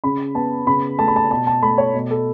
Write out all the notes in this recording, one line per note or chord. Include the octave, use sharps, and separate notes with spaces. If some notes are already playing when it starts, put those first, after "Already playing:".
C#3 B5
B3 A5
C#3 B5
A3 A5
B5
A5
B2 A5
A5
A3 B5
C#5
B2
A4